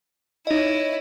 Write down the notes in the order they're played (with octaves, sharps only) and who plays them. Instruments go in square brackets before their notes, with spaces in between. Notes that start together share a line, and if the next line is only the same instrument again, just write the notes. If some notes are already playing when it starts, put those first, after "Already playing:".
[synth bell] D#4 D#5 [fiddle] E4 C#5